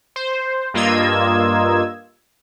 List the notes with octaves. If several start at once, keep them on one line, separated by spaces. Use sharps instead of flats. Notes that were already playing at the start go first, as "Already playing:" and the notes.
C5
G2 A#3 F4 D#5 E6 G#6